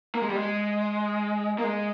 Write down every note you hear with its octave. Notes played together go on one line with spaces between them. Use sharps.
A#3
G#3
G3
G#3
A#3
G#3